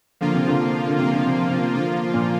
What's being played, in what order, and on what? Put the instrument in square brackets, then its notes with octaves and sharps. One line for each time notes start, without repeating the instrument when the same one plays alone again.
[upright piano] D3 [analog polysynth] F3 A#3 F4
[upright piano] C3
D3
D3
[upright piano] C3 [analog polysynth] F3 A#3 F4
[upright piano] D3
C3
C3
[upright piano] D3 [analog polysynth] F3 A#3 F4
[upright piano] A#2